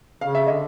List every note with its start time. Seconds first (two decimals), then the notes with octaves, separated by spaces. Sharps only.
0.21 C#3 F5
0.35 E5
0.47 D3 D#5